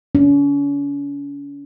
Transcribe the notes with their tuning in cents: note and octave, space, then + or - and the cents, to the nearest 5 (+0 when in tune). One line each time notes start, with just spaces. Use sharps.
C#4 +40